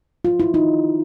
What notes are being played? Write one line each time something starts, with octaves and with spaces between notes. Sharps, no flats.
F4
E4
D#4